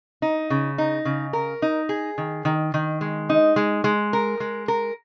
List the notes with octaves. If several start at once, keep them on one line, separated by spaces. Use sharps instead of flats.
D#4
C#3
D#4
C#3
A#4
D#4
G#4
D#3
D#3
D#3
G#3
D#4
G#3
G#3
A#4
G#3
A#4